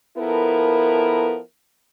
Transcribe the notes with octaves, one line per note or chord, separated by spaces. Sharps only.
F3 B3 E4 A4 A#4